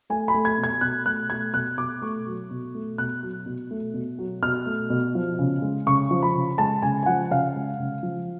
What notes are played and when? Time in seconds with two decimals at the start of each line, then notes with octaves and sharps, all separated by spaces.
0.10 A3 G#5
0.28 B5
0.34 A3
0.45 G#6
0.58 B2
0.64 G#6
0.81 B2 F#6
1.05 A3 F#6
1.30 A3 G#6
1.53 B2 F#6
1.77 B2 D6
2.02 A3 C#6
2.27 F#3
2.51 B2
2.75 A3
2.98 B2 F#6
3.23 F#3
3.46 B2
3.71 A3
3.94 B2
4.19 F#3
4.43 B2 F6
4.66 A3
4.90 B2
5.15 F3
5.39 C#3
5.62 G#3
5.86 C#3 C#6
6.11 F3
6.23 B5
6.35 C#3
6.58 G#3 A5
6.82 C#3 G#5
7.03 G#5
7.06 F3 F#5
7.31 C#3 F5
7.55 G#3
7.80 C#3
8.03 F3